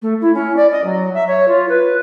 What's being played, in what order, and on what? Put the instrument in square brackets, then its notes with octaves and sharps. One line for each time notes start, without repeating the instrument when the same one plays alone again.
[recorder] A3
E4
C#4
D5
D#5
F#3
E5
C#5
F4
B4